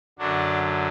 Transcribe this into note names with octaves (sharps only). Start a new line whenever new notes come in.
F#2 D3 F#3 D4